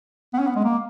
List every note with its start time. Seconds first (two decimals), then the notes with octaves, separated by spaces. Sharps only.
0.33 B3
0.39 C#4
0.47 B3
0.56 G#3
0.64 A#3